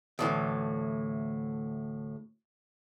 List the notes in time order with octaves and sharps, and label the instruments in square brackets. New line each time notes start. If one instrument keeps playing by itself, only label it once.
[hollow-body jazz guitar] D2 A2 E3